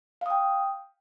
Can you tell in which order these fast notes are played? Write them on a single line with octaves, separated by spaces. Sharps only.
F5 D#6 G5